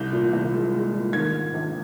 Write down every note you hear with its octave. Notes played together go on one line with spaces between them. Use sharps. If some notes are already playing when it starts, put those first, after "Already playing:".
Already playing: C2 G6
A#2
C2
G#3
G#3
A#2
D#3 G#6
G#2
A#1